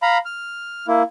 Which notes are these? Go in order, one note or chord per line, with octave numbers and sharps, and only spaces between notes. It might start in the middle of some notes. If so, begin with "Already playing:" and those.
F5 A#5 B5
F6
A#3 E4